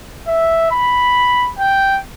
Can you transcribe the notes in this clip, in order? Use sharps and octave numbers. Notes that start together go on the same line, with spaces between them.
E5
B5
G5